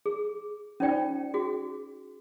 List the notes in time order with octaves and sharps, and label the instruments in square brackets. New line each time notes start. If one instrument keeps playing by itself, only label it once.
[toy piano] G#4
C#4 D#4 F4 C5 D5 G5
F#4 G#4